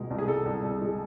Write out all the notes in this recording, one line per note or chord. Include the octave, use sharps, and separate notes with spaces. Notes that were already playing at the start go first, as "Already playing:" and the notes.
Already playing: C2 B2 G#3
C2
G#4
C2 A4
C2
C2
G#3